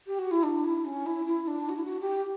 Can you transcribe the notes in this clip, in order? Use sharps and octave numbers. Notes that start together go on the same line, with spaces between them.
G4
F#4
E4
D4
E4
C#4
E4
E4
D4
F#4
E4
F#4
G4